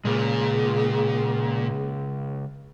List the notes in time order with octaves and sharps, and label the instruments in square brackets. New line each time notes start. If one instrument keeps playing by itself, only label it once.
[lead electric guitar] A#2 [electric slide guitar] C#3 G#3 [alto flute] G#4